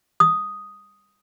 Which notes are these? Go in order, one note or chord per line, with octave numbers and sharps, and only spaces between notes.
D#6